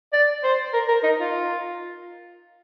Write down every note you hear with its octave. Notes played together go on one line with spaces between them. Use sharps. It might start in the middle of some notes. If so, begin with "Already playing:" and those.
D5
C5
A#4
A#4
D#4
F4